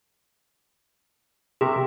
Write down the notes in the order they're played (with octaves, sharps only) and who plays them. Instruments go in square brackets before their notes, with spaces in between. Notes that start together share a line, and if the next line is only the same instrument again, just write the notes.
[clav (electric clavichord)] C3 A#4 E5 [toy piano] G4